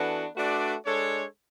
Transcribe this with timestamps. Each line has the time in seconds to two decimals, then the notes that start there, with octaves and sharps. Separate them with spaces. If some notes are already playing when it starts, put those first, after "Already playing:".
Already playing: E3 B3 D4 F#4 A4
0.36 A3 D4 F#4 B4 D5
0.85 G#3 D4 A4 C#5